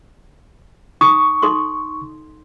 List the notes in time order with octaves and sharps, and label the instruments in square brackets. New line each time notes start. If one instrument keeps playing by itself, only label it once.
[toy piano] D#4 D#6 [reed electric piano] C#6
[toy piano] D#4 A4 C6